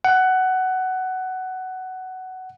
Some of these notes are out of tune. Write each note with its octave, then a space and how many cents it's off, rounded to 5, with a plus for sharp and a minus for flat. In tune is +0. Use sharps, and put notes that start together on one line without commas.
F#5 +15